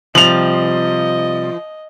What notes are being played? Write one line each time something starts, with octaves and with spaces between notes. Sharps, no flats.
C3 F3 G3 D#5 F7 F#7